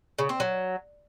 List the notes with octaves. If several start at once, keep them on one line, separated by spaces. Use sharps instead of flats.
C#3
C4
F#3